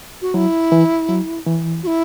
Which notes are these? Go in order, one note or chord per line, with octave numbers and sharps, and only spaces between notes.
F#4
F#3 E4
E3
F#3
E3
F#4
E4